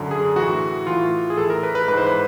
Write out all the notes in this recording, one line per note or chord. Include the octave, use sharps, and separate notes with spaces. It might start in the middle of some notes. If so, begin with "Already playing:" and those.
Already playing: F#2 D3
G#4
A2 E3 F#4
A2 E3 F4
G#4
A2 E3 A4
A#4
B4
B4
G#2 E3 B4 C5
B4